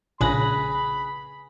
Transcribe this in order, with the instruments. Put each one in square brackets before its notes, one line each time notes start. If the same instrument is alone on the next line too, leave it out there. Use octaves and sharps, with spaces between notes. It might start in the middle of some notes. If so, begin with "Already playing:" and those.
[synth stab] A#1 F#6 A#6 [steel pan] C#3 D4 [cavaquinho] G#4 B4 [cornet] B5